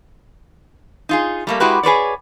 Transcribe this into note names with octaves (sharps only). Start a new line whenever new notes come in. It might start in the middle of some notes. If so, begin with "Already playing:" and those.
D#4 F4 G#4
G3 A3 A#3
G#3 E4 F#4 G4 B4
G#4 B4 C#5 D5